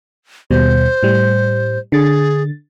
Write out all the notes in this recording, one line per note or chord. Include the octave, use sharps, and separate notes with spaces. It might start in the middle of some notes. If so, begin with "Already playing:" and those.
D#2 B2 G3 C5
A2 G3
D3 G#4 A6